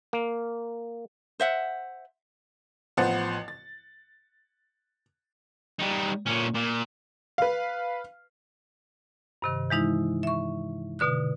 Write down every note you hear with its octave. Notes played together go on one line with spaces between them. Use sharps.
A#3
C5 E5 F#5
A1 F3 B3 C5 F#5 A6
A6
G3 D#4
A#2 C#4
A#2
B4 F5
G2 C3 D#3
E3 G#3 D#4 E4
E5 C#6
B2 D3 D#6 F#6